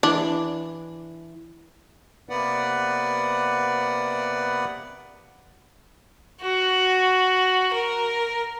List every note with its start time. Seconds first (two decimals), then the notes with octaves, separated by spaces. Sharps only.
0.03 E3 D4
2.29 C3 A#3 B3 B4 D5 F#5
6.42 F#4
7.73 A#4